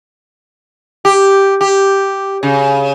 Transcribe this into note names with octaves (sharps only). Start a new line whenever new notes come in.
G4
G4
C#3